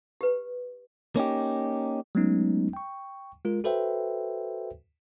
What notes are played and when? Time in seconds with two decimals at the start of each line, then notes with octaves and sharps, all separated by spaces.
0.21 G4 B4
1.16 A#3 C#4 D#4 G4
2.15 F#3 G#3 A3 B3 C#4 D#4
2.73 G5 C#6
3.45 G#3 F4 A#4
3.64 F#4 A4 B4 C5 E5 G5